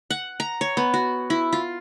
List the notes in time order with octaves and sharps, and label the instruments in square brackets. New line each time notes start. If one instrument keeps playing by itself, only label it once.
[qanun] F#5
A#5
C#5
B3
F#4
E4
F4